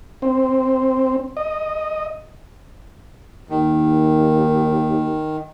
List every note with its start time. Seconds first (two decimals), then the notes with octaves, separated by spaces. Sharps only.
0.22 C4
1.37 D#5
3.50 D#2 D#3